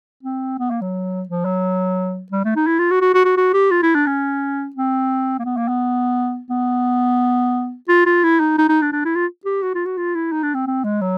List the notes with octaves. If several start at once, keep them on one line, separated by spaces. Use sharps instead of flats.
C4
B3
A#3
F#3
F3
F#3
G3
A3
D#4
E4
F4
F#4
F#4
F#4
F#4
F#4
G4
F4
E4
D4
C#4
C4
A#3
B3
A#3
B3
B3
F4
F4
E4
D#4
D#4
D#4
D4
D4
E4
F4
G4
F#4
F4
F#4
F4
E4
D#4
D4
C4
C4
G#3
F#3